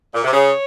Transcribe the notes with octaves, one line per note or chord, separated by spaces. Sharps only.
A#2
C3
C#3 C#5